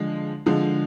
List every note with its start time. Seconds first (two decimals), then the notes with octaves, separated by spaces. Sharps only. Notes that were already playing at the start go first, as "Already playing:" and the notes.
Already playing: D3 F3 G#3
0.46 D3 F3 G#3